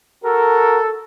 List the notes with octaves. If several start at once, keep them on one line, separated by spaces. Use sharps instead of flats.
F#4 A4 A#4